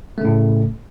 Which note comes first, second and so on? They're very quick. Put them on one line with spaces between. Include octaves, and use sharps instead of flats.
A3 C#3 A2